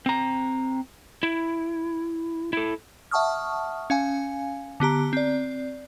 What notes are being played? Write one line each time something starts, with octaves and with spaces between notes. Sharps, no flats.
C4 A#5
E4
E4 A4
E5 F#5 A5 C#6 D#6 F6
C#4 F5 G#5
D3 B3 G4 A#5
C4 D5